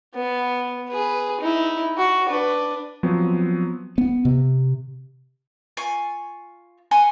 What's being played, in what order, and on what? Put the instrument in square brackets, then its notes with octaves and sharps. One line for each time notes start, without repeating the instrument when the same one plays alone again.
[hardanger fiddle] B3
G#4 B4
D#4 E4
F#4
D4 B4
[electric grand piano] F3 F#3 B3 C4
[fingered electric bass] B3
C3
[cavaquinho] F4 G#5 C#6
F#5 G#5 C6